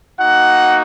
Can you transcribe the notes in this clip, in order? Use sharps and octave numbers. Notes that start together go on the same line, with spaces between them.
A#3 D#4 F#4 F#5